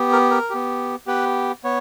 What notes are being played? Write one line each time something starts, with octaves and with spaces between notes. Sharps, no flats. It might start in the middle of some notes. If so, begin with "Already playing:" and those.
Already playing: B3 G4
A#4
A#4
B3 G4
B3 G4 B4
B3 C#5